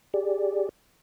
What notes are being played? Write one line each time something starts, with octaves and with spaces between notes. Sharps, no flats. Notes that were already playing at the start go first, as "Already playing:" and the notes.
G4 G#4 D5